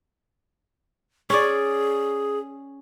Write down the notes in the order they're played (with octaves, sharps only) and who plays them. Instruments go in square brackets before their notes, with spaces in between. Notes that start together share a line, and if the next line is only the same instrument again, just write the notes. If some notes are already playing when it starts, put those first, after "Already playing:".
[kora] C#4 D5 [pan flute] G#4